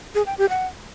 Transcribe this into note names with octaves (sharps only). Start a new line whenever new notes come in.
G#4
G5
G4
F#5